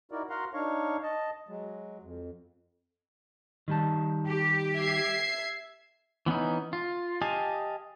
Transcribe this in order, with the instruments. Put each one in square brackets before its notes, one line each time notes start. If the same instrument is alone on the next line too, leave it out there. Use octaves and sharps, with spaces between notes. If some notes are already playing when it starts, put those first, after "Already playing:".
[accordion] D#4 E4 F#4 A#4 D5
F#4 A#4 F5 F#5 A#5 C6
D4 D#4 C#5 F5 C#6
D#5 A5
F#3 G#3
F2
[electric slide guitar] D#3 G3 A5
[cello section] G4
[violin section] E5 G#6 C7
[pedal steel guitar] E3 B3 C#4 D#4
F4
G4 D#5 F5 G#5 A5